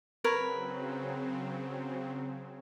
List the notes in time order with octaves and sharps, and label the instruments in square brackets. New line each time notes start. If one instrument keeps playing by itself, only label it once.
[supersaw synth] C#3 F#3 C4 [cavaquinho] A#4 B4 C#5